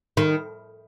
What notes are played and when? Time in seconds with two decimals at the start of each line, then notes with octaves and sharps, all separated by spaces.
0.17 D#3